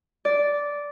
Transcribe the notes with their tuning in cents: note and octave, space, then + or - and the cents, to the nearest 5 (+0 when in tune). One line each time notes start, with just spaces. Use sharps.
D5 -10